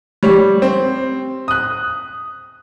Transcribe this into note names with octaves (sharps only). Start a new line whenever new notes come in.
G3 C#5
C4
D#6 F#6